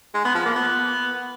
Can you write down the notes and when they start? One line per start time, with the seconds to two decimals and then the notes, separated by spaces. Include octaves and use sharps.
0.14 G#3
0.25 B3
0.35 F3
0.45 A#3
0.55 B3